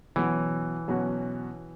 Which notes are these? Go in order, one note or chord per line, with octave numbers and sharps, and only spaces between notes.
B2 E3 F#3 C#4 F#4
B2 F#3 C#4 F#4